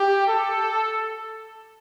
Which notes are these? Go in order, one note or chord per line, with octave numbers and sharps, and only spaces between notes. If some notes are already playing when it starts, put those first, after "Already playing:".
Already playing: G4
A4